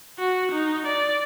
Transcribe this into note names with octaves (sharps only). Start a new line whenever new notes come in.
F#4
D#4
D5